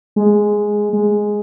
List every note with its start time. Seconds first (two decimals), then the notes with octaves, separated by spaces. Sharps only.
0.16 G#3
0.93 G#3